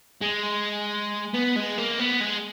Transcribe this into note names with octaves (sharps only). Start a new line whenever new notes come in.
G#3
B3
G#3
A#3
B3
G#3